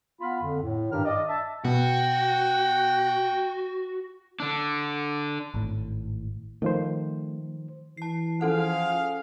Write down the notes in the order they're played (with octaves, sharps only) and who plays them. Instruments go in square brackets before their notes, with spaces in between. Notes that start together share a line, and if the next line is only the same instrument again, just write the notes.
[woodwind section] B3 F4 F5 B5
F2 D3
A2
G2 D#3 D4 G4 A#4 F6
D5 D#5
E5 A5
[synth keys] B2 [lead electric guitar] F#4 [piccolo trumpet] G5
[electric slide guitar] D3 D4
[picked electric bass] G#1 A2
[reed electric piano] D#3 F3 C5 [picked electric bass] A3
[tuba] E3 [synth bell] A5 C7
[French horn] F3 [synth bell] C#4 A4 F#5 [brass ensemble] G#4 F5